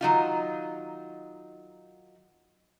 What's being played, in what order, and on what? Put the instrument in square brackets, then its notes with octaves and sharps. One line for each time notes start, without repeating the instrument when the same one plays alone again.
[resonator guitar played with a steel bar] D#3 F#3 D#4 F4